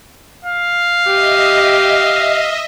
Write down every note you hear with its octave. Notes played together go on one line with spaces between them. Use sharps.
F5
G4 D#5 E5